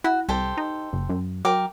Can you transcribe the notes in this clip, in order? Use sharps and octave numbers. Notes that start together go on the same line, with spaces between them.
E4 F#4
C2 G4 A4 C5
D#4
F#1
F#2
F#3 A#4 G5 D6